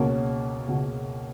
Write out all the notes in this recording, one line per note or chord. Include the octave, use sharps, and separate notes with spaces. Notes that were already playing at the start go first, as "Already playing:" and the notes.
Already playing: C#2 B2 A#3 C#4
C#2 B2